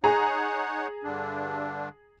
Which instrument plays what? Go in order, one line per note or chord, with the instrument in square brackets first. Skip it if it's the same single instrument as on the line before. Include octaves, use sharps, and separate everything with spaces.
[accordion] D#4 C#5 F#5 [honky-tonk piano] G#4 A#5
[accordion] G2 D3 D4